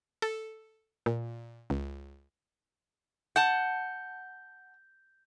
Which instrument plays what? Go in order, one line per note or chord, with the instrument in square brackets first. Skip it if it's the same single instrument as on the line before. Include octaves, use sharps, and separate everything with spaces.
[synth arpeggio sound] A4
A#2
C#2
[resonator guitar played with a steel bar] F#5 A5 [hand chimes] G6